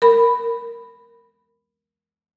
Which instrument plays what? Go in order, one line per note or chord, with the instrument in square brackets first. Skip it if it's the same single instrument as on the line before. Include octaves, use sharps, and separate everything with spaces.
[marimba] A#4 B5